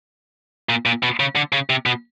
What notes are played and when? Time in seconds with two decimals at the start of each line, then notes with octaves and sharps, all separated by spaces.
0.69 A#2
0.86 A#2
1.03 B2
1.20 C#3
1.36 D3
1.53 C#3
1.70 C3
1.86 B2